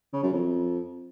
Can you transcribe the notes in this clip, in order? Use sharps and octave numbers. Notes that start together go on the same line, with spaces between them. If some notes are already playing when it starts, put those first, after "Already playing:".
C#3
F#2
F2